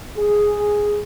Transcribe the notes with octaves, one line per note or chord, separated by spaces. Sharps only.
G#4